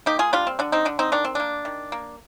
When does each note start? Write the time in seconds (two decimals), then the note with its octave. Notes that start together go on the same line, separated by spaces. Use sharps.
0.06 A#3 D#4 G4
0.19 F4 G#4
0.33 G3 D4 F4
0.47 C4
0.59 D3 D4
0.72 C4 D#4
0.85 D3 D4
0.99 C4 D#4
1.12 D#3 D4
1.24 C4
1.35 A#3 D4
1.65 D#3
1.92 A#3